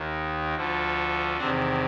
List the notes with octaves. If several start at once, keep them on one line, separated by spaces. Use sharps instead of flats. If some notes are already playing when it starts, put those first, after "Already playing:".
Already playing: D#2 D#3
D2 D3 F3
E2 C3 D#3 C4 D4